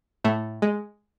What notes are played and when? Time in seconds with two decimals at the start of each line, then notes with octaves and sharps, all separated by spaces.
0.24 A2 A3
0.62 G#3